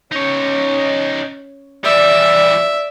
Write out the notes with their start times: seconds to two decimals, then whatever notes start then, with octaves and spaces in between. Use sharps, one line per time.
0.12 C#4 D#4 C#5
1.84 E3 G3 D5 E5